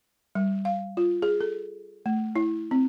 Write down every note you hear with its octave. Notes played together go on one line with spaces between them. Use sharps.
G3
F5
F4
G#4
A4
A3
E4
C4